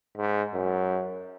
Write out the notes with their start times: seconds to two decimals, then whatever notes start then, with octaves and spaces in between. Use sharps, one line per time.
0.17 G#2
0.54 F#2